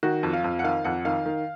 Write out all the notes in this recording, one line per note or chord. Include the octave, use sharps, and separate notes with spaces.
D#3 F#4
F2
F5
F2
F#5
D#3 F5
F2 F#5
D#3 F5
D#3